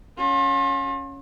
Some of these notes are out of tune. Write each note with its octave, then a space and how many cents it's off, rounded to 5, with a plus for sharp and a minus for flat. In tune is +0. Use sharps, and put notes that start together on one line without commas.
C#4 +0 F4 +40